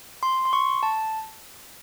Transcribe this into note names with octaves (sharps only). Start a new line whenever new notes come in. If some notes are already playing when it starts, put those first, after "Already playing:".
C6
C6
C#6
A5